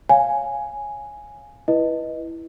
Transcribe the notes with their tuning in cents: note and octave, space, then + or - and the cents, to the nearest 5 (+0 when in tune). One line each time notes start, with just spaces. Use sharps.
C#5 +0 F5 +0 G#5 +0
E4 +0 B4 -15 D#5 +0